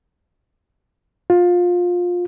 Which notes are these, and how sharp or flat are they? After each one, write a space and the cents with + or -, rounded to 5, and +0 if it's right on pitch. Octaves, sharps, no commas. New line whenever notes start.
F4 +20